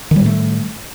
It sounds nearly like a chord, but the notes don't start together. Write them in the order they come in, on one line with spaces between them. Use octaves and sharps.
D#3 G3 A2 A3